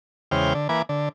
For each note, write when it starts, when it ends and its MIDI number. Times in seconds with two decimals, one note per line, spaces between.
0.31 0.54 40
0.31 0.54 49
0.31 0.54 56
0.31 0.54 72
0.31 0.54 79
0.31 0.54 89
0.55 0.68 50
0.69 0.82 52
0.69 0.82 58
0.69 0.82 71
0.69 0.82 80
0.69 0.82 86
0.89 1.09 50